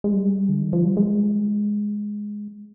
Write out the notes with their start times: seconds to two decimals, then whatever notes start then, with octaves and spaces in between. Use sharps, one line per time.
0.04 G#3
0.13 G3
0.49 D3
0.61 D#3
0.73 F3
0.84 G3
0.97 G#3